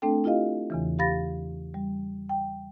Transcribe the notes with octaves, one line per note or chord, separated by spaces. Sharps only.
A3 C4 D4 A4 G5
E4 F4 G4 D#5 F5
E2 C#3 E3
G4 F5 B5 A6 A#6
G3
G5